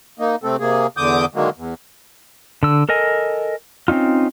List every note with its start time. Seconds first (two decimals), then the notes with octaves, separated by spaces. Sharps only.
0.19 A#3 D#4
0.44 C3 A3 C4 A4
0.60 C3 A#3 G#4
0.97 E2 D3 D6 D#6 G6
1.35 D3 D#3 F#3 G#3 A#3
1.57 E2
2.63 D3 E6
2.89 A4 A#4 D#5 G#5
3.88 C4 C#4 D#4 F4